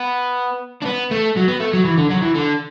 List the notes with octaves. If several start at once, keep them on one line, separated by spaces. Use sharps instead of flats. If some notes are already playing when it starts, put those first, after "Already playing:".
Already playing: B3
D4
B3
A3
F#3
B3
A3
F#3
E3
D3
F#3
E3
D3